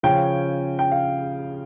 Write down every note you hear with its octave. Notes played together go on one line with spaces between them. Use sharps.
C#3 F3 C#4 G5
G5
F5